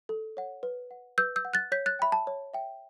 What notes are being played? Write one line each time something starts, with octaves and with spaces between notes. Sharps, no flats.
A4
C#5 F#5
B4
F#5
B4 E6 G6
E6 G6
F#5
F#6 A6
C#5 G6 B6
F#6 A6
E5 G5 B5
A5
C#5
E5 G5